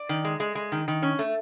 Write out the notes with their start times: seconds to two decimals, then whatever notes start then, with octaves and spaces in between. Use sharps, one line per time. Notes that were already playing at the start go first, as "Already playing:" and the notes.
Already playing: D5
0.09 D#3
0.25 G#3
0.40 G#3
0.55 G#3
0.72 D#3
0.88 D#3
1.02 C#4
1.19 A3